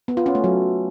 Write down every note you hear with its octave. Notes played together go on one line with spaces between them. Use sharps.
B3
F4
C#4
A3
F#3